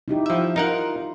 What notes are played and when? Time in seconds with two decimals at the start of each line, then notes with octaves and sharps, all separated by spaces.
0.08 D#4 E4 G4
0.26 F3 E5
0.56 D#4 F4 A#4 F#5